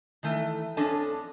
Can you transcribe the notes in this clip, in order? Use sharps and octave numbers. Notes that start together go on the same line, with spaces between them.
D#3 E3 A3
F2 C#4 D4 A4 D#5 A5